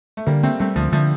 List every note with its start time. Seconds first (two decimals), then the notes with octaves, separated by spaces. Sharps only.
0.17 A3
0.27 D3 G3 A#3
0.43 A3 A#3 C4
0.60 G3 A3 C4
0.76 D2 F3 A3
0.92 D3 F3 A3